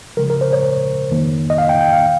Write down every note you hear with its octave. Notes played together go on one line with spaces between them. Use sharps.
C#3 F3 G#3 A#4
A#4
C5
C#5
F2 D#3 A#3
D#5
F5
G5
G5
F5